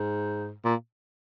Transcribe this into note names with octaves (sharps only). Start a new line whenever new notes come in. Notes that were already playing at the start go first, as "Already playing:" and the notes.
Already playing: G#2
A#2